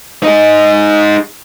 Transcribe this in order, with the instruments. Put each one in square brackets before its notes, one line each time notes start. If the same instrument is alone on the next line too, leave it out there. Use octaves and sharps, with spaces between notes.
[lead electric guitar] D#4 G#4